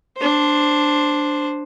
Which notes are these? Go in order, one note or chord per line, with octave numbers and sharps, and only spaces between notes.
D4 C5